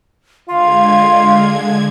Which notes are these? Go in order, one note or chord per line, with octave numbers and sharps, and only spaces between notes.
D3 G#3 F4 F5 G#6